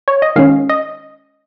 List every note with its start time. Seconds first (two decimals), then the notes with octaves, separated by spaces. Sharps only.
0.08 C#5
0.22 D#5
0.36 D#3 G#3 C#4 F5
0.69 D#5